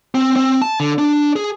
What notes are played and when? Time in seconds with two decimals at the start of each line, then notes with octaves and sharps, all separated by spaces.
0.15 C4
0.36 C4
0.62 A5
0.80 D3
0.98 D4
1.36 G#4